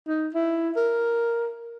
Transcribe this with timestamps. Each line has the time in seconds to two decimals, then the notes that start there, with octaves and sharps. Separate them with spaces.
0.07 D#4
0.34 E4
0.76 A#4